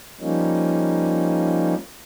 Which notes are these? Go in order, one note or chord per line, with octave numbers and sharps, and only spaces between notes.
F3 G3 A#3 C#4 D#4